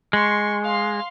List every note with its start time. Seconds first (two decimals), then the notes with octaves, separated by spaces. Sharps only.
0.13 G#3 C6 C#6
0.64 F5 C6